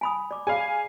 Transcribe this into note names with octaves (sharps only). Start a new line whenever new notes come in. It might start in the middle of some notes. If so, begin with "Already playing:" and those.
G#5 B5 D#6
D5 D6
G#4 D5 F5 G#5 B5